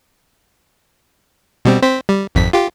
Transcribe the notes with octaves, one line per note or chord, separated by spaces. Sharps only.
B2 G3 C4
C4 C5 B6
G3
G#1 F2 B6
F4 G4